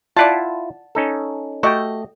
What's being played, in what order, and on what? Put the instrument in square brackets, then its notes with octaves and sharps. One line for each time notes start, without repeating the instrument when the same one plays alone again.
[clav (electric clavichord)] E4 F4 [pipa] D5 F#5 A5
[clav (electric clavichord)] C#4 D#4 A4
[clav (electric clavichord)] A3 G5 [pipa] F#4 G4 D#5